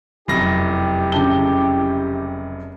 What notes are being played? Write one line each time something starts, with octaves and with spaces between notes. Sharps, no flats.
F1 F#2 E4 G4 A#6
C#3 A5 G7